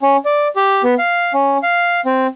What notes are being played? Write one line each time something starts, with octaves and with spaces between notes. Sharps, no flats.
C#4
D5
G4
B3
F5
C#4
F5
C4